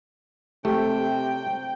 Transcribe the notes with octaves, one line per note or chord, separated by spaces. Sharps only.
C3 A3 G4 G5